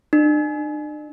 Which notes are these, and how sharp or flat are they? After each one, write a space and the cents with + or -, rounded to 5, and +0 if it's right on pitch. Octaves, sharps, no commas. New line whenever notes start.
D4 +45